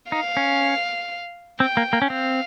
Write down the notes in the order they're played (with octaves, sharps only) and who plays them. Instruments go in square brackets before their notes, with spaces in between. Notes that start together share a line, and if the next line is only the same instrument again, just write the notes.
[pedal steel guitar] D#4 [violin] F5
[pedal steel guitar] C#4
[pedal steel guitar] C4 [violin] G5
[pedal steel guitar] A#3
A#3
C#4
[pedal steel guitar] C4 [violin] F5